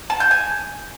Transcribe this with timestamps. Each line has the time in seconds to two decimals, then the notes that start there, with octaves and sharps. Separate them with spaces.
0.10 A5
0.20 G6
0.31 G#5